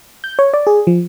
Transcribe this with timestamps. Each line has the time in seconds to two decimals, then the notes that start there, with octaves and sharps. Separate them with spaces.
0.24 G6
0.39 C#5
0.54 D5
0.67 G#4
0.87 F3